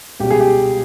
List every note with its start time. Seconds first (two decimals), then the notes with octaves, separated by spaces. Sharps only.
0.20 C#2 B2 G3 G4
0.30 G#4
0.40 G4